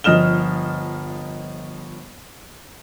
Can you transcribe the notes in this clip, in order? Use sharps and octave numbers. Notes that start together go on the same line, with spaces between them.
G1 F3 D#5 F6 E7 G7